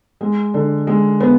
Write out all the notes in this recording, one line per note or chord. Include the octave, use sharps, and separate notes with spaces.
G#3
D3
G#3
B3